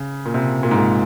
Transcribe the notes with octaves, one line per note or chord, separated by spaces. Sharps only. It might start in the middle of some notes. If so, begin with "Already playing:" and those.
Already playing: C#3
A#2
C3
A#2
G#2
A#2